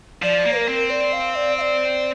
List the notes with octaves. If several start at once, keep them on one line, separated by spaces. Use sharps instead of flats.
F3 D5
A#3
A#4
C4
D5
F5
D5
F5
D5